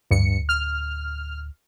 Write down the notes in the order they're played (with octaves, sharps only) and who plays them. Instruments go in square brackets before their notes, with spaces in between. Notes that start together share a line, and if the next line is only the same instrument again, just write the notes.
[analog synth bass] D1 [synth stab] G2 C#7
[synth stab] F6